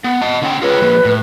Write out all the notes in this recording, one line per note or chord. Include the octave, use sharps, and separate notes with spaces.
B3 F#5
D#5 A5
D3 C#4 G5
F4 G#4 B4 C#5
F3 A#3
A2